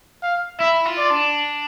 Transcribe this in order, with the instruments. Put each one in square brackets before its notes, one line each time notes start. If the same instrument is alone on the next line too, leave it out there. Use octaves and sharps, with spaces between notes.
[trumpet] F5
[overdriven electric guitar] E4 [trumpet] E5
[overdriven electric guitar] F4
[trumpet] D5
[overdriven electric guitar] D4